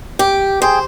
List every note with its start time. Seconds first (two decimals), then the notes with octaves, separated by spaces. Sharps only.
0.19 G4
0.62 G#4 C5 G5